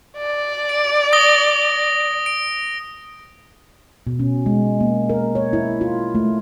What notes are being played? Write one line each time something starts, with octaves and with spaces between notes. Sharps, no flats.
D5
D7
D#6 A#6 G7
D7
B2
C#4
G#3
A#3
A#4
C#5
E4
F4
A3